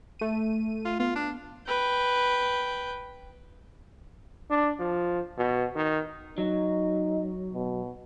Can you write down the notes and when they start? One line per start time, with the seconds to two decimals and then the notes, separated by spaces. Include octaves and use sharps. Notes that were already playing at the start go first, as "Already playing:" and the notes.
0.19 A3 D#7
0.85 F4
1.00 B3 F4
1.16 D4
1.67 B4 G5
4.50 D4
4.80 F3
5.38 B2
5.76 D#3
6.38 F#3 D#4
7.54 B2